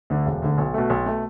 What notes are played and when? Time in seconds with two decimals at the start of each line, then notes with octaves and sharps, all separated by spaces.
0.10 D2 D3
0.26 E1
0.42 D2 D3
0.58 B1
0.74 B2 A3
0.90 B1
1.06 B2 A3